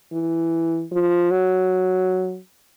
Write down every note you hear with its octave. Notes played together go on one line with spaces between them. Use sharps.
E3
F3
F#3